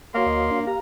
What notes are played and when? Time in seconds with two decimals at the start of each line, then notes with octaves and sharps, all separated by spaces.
0.15 A#3 F#4 C#5 F5 C6
0.26 D2 D#5
0.51 D4
0.67 G4 F5 A#5